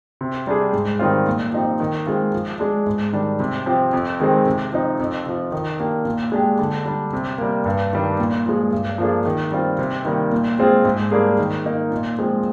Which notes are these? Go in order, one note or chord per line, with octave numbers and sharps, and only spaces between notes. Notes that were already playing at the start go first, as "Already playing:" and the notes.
C3
G3 D4 G#4
G#2
D#3 G3 C4 F4
A#2
F3 C4 D#4 G4
D#3
G#3 C4 F4
F3
G#3 D4
G#2
D#3 G3 D4
C3
F3 C4 G4
F2
D#3 G#3 C4
C3
F3 C4 D#4
F2
C3 F3
D#3
A#3 D4 G4
A#2
G#3 D4 G4
D3
G3 D4
C3
G3 A#3
G2
D#3 G3 D4
A#2
F3 G#3
G2
F3 A#3 D4 G#4
D#3
G3 C4 F4
C3
D#3 G3 A#3
A#2
G#3 C4 F4 G#4
G#2
G3 A#3 D4 G#4
D#3
A#3 D#4
A#2
F3 G#3 C4